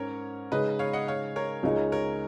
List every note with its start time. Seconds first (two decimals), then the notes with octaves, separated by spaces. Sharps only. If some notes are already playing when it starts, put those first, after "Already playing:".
Already playing: G#2 C#4 A#4 C#5
0.52 C#3 G#3 D#4 B4 D#5
0.79 C#5 F5
0.93 D#5 F#5
1.08 C#5 F5
1.36 A#4 C#5
1.63 C#2 C#3 G#3 D#4
1.92 A#4 C#5